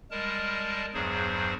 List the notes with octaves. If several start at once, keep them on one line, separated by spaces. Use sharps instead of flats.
G3 G#3 A#4 A5
E2 G2 F#3 G#4 C5